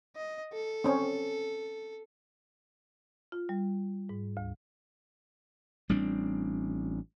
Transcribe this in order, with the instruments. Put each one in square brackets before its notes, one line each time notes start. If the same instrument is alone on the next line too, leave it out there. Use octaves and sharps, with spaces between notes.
[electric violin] D#5
A4
[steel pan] C4 C#4
[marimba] F4
G3
G#2
D2
[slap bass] A1 G3 C4 D4